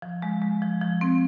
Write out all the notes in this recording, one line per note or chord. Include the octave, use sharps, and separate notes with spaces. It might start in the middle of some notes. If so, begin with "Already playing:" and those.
F3
G#3
G#3
F3
F3
C4